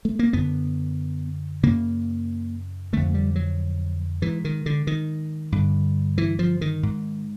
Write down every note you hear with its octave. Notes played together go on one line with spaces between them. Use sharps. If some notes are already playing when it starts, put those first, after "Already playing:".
A3
A#3
F#2 D3 B3
F#2 C#3 A#3
F2 D3 A3
G3
F#3
G#2 E3
D#3
D3
D#3
G2 D3
E3
F3
D#3
G#2